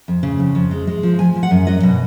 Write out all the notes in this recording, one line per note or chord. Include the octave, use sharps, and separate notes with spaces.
F2
C#3
F2
F2
G#3
G#3
F3
F3 G#5
F3
F#5
F#2
F#3 D#5
B2